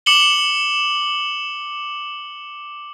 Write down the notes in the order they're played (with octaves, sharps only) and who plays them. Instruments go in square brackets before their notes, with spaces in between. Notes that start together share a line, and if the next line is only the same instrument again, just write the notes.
[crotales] D6 C#7 E7 F#7 G7